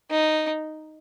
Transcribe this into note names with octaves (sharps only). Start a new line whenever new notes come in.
D#4